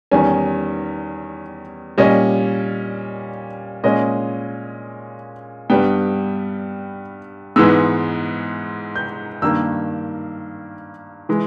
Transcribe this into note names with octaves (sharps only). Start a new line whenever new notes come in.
E2 D#3 G3 C#4 G#5
A#2 G3 C#4 D#5
A#2 G#3 C#4 D#5
G2 G3 B3 G5
G#2 E3 G#3 B3 E6
G6
G2 D#3 A#3 E6
E3 G#3